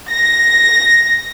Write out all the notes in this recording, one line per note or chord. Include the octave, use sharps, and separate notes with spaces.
A#6